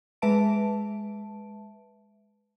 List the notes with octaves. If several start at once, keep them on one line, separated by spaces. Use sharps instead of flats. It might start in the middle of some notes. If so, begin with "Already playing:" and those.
G#3 B4 E5 A5 D7